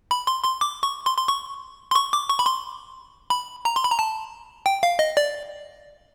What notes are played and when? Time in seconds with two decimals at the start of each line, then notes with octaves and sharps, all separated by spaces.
0.11 B5
0.27 C6
0.44 C6
0.61 D6
0.83 C#6
1.06 C6
1.17 C6
1.28 C#6
1.91 C6
1.95 C#6
2.13 D6
2.29 C#6
2.39 B5
2.46 C6
3.30 B5
3.65 A#5
3.76 C6
3.84 B5
3.91 A#5
3.99 A5
4.66 G5
4.83 F5
4.99 D#5
5.17 D5